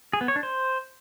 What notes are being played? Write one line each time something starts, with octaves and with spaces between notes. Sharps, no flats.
G#4
B3
C#5
D4
C5